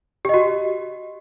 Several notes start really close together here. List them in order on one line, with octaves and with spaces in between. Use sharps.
G4 D#5 F#4